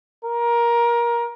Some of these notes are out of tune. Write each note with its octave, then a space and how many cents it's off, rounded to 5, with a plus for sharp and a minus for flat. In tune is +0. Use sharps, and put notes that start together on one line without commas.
A#4 +20